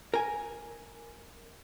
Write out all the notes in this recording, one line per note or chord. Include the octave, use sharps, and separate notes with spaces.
A#4 G#5